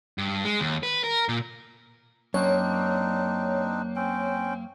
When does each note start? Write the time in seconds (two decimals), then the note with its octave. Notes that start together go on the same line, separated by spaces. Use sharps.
0.18 G2
0.45 G#3
0.60 D#2
0.83 B4
1.04 A#4
1.29 A#2
2.34 F#2 A#3 C4 D4 D#4 C#5
3.96 C4 C#4 G5